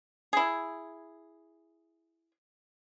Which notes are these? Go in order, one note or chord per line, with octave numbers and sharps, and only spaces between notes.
E4 G#4